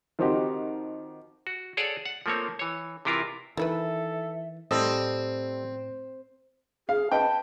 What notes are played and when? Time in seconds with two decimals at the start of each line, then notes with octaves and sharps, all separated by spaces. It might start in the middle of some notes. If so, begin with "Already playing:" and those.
0.19 D#3 F3 C4 D#4 F#4 G4
1.47 F#4
1.77 G#4 A4 C#5 D5 F#5
2.05 F#5
2.26 F3 A3 A#3 C4 C#5
2.59 E3 C#5
3.05 C3 E3 E4 F4 A#4
3.57 D#3 E3 E4 A4 B4 E5
4.71 A2 G3 C4 A4 D#5
6.89 G#4 F5
7.11 B4 D#5 G5 A5